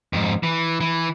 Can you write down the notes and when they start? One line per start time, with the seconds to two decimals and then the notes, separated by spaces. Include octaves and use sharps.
0.13 F2 G#2
0.43 E3
0.81 E3